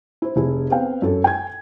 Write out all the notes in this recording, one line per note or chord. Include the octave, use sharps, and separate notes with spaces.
E4 C5
F1 E4 G#4
B3 C4 F5 G5
F#2 E4 A4
G5 G#5 G#6